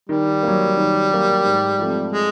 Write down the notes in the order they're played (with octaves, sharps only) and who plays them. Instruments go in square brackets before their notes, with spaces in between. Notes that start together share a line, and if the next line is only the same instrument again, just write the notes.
[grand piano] D#3 [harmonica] G3
[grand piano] F#3 A#3
D#3
F#3 A#3
G#2
F3 A3 C4
[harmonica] G#3